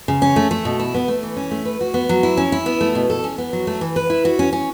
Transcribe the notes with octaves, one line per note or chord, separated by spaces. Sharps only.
C#3
C#4
A3
A3
B2
E4
B3
A3
E3
C#4
A3
B4
F#4
B3
F#3
E4
C#4
E4
B3
A3
B2
A4
C#4
B3
F#3
A3
E3
B4
E4
F#4
C#4
C#4